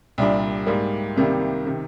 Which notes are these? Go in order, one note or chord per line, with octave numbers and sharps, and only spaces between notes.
C2 A#2 G3 D4
G#2 G3 A#3
C2 C3 D#3 G3 A#3
C3 D#3